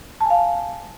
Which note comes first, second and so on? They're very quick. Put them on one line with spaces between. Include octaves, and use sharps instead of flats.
A5 G#5 F5